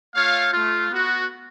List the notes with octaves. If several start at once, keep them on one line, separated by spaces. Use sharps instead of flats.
A3 F4 C#5 F5
A3 F4
B3 F#4